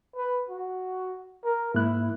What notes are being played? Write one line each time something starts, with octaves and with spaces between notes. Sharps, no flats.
B4
F#4
A#4
G#2 A#3 E4 F#6